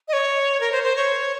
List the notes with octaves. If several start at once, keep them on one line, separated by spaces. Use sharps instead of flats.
D#5
C#5
A#4
C5
C5
C#5